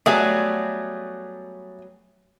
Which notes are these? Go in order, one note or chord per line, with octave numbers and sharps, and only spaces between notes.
F#3 G3 A3 B3 G#4